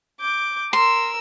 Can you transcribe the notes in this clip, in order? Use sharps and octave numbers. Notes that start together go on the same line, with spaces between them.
D6 G6
A#4 C6 E6